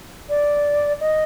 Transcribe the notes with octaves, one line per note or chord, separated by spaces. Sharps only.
D5
D#5